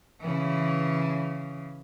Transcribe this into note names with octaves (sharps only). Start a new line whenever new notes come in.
C#3 E3